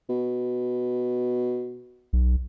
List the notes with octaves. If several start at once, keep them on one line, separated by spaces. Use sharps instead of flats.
B2
B1